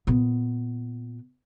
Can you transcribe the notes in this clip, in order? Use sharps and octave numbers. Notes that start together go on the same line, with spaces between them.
A#2 B3